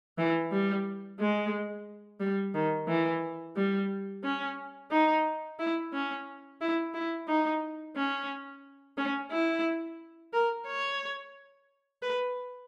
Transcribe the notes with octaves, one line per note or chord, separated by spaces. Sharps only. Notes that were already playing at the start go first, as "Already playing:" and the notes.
E3
G3
G#3
G3
D#3
E3
G3
C#4
D#4
E4
C#4
E4
E4
D#4
C#4
C#4
E4
A#4
C#5
B4